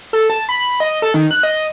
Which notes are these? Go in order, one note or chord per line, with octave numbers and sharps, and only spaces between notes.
A4
A5
B5
D#5
A4
D#3
F#6
D#5